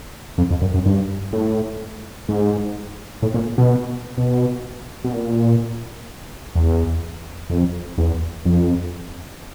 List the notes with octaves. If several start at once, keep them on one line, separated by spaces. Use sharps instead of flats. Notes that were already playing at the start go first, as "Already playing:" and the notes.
F2
F2
F#2
F#2
G2
A2
G#2
A2
A#2
B2
B2
B2
A#2
E2
F2
E2
F2